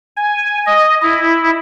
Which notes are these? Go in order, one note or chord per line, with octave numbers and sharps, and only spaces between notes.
G#5
D#5
E4